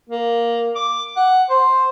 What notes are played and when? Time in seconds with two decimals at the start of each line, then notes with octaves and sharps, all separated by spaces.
0.10 A#3
0.76 D6
1.17 F#5
1.50 C5